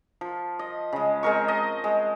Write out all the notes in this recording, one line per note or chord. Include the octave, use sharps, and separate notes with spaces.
F3
D#5
C#3 G#3
G#3 C4 A#4 C#6
D#5 A5
G#3